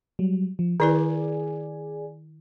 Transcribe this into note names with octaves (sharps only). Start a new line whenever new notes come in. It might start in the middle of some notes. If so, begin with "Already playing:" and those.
F#3 G3
F3
D#3 E4 G#4 B4 D5 G#5